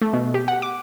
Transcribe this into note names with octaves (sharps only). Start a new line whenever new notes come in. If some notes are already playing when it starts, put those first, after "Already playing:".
A3
B2
G4
F#5
D6